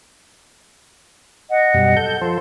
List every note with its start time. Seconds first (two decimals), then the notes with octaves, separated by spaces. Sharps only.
1.50 D#5 F#5
1.74 F#2 B2 G3
1.97 A4 G6
2.21 F3 A4 C5